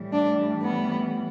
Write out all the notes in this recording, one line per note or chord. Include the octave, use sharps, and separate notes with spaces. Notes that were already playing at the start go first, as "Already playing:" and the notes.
Already playing: A2 E3 G3
D4
B3